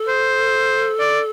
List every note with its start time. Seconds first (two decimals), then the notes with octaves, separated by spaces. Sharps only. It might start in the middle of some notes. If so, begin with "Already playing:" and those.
Already playing: A4
0.08 C5
1.00 D5